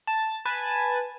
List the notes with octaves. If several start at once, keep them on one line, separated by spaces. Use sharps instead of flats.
A5
B4 G#5 A5